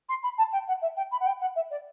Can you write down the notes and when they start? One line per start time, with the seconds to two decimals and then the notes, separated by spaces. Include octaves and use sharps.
0.09 C6
0.23 B5
0.38 A5
0.52 G5
0.68 F#5
0.82 E5
0.96 G5
1.12 B5
1.20 F#5
1.26 G5
1.41 F#5
1.55 E5
1.71 D5